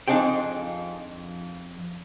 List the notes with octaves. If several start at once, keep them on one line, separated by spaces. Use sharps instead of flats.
F2 A#3 D4 D#4 G#4 G5